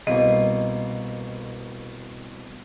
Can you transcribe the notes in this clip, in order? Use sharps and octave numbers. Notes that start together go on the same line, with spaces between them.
C2 B2 A#3 D#5